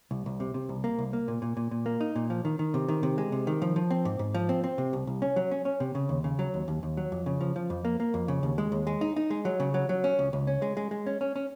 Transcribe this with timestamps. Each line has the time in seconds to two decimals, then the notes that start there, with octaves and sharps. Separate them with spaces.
0.11 C2
0.26 C2
0.40 C3
0.54 C3
0.69 C2
0.84 A#3
0.99 C2
1.13 A#3
1.28 A#2
1.42 A#2
1.57 A#2
1.71 A#2
1.86 A#3
2.01 D#4
2.15 A#2
2.30 F3
2.45 D#3
2.59 D#3
2.74 C3
2.88 D#3
3.03 C3
3.18 G#3
3.32 C3
3.47 D#3
3.62 F3
3.76 F3
3.91 C4
4.05 G#2
4.19 G#2
4.34 F3
4.49 C4
4.64 C4
4.78 C3
4.93 C2
5.07 C2
5.22 C#4
5.36 F#3
5.51 C#4
5.65 C#4
5.80 C3
5.95 C#3
6.09 D#2
6.24 C#3
6.39 F#3
6.54 D#2
6.68 D#2
6.83 D#2
6.97 F#3
7.12 F2
7.26 C#3
7.41 F3
7.56 F3
7.70 F2
7.85 A#3
8.00 A#3
8.14 F2
8.28 C#3
8.43 D#2
8.58 G#3
8.72 D#2
8.87 G#3
9.01 D#4
9.16 D#4
9.30 G#3
9.45 F#3
9.60 C#3
9.74 F#3
9.89 F#3
10.04 C#4
10.19 C#2
10.33 C#2
10.47 C#4
10.62 G#3
10.77 G#3
10.91 G#3
11.06 C#4
11.21 C#4
11.36 C#4